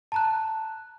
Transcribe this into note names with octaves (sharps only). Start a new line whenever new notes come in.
A5 A#5 F#6